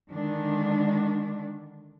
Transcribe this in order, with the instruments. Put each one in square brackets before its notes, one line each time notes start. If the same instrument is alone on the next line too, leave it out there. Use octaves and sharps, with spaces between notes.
[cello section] D3 D#3 G#3 D4